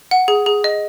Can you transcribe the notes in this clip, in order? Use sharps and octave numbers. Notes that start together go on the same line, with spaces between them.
F#5
G#4
G#4
D#5